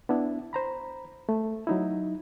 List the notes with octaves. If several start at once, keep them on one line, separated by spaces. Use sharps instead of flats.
B3 D4 E4
C5 A#5 B5
A3
F#3 D#4 E4